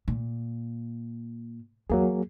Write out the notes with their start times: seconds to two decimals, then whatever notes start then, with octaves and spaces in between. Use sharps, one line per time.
0.08 A#2
1.90 E2 F#3 A#3 G#4